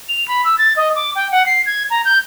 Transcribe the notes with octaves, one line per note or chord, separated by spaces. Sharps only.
F7
B5
E6
A6
D#5
D6
G5
F#5
C7
G#6
A#5
G6